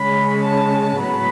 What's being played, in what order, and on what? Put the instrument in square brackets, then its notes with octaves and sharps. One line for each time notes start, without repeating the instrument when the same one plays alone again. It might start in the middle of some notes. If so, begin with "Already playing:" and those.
Already playing: [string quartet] C#3 G#3 C#4 B5
A5
A2 F#3 B3 B5